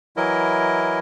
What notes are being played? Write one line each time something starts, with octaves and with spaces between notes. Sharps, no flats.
E3 F#3 E4 A#4 D#5